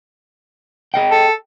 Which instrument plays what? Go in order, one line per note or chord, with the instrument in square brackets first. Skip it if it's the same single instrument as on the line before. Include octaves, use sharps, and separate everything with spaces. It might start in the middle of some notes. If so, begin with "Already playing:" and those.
[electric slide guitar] G#4 D#5 G5
[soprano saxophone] A4